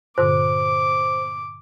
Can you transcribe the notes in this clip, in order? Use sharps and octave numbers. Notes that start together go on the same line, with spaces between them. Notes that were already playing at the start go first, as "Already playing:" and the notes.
G2 A#2 D3 C5 D6